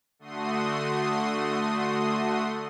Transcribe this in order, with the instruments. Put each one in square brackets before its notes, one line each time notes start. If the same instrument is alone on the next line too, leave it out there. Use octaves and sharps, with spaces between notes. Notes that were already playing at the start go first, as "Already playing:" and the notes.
[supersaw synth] D3 A3 F#4 C6 D#6